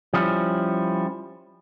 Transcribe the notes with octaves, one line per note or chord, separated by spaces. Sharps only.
F3 G3 C#4 E4